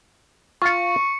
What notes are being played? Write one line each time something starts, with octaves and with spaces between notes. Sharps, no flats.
F4 F5 C#6 C#7